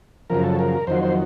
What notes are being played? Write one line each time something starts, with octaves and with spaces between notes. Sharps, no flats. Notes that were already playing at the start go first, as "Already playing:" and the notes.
F#2 C#3 F3 A#4
A4
A#4
F2 D#3 F#3 C5
C5